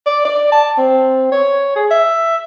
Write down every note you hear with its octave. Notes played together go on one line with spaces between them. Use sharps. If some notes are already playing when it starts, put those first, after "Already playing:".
D5
D5
A5
C4
C#5
G#4
E5